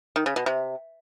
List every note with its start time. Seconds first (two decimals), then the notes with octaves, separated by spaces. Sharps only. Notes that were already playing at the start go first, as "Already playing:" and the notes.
0.16 D#3
0.26 C#3
0.36 B2
0.46 C3